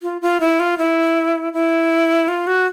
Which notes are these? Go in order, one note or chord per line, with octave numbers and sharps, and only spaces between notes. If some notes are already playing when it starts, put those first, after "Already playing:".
F4
F4
E4
F4
E4
E4
F4
F#4